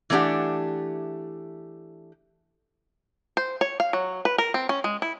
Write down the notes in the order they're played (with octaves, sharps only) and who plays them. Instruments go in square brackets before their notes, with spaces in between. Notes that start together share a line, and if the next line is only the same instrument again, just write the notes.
[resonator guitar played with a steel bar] E3 A3 A#3 D4 G4 F#5
[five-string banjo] C5
C#5
F5
F#3
B4
A#4
C4
C#4
G#3
E4